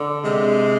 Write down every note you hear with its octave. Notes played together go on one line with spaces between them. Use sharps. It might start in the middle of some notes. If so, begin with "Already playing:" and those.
Already playing: D3
C3 G#3